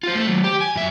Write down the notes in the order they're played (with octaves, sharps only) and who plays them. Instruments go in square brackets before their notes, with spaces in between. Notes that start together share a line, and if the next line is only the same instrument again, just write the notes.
[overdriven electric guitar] F4 C5
A3 A4
D#3 F#3
G4
G#5
F#2 E5